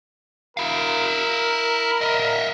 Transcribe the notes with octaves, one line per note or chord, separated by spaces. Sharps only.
E4 A#4 F5
D#5 E5